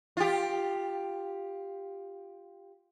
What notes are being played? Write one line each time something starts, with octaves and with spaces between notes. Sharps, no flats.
F4 G4